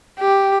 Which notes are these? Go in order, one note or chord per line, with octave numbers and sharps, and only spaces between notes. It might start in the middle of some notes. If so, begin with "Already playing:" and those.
G4